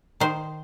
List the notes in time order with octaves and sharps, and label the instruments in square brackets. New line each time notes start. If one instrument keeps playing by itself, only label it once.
[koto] D#3 C5